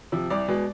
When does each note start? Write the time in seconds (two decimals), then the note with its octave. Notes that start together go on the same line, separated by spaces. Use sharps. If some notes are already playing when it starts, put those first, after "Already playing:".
0.12 C3 F3
0.30 C2 D5
0.48 B2 G#3 B3